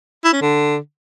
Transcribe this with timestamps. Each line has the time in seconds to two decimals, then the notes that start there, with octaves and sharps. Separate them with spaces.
0.24 E4
0.33 C#4
0.42 D3